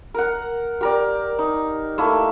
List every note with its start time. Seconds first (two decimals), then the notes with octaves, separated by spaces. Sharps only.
0.14 A#4 F#5
0.81 G4 A#4 D5
1.39 D#4
1.98 A3 A#3 E4